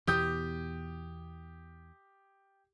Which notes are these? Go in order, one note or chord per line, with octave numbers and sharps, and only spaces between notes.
E2 B2 E3 G4 D#6 G6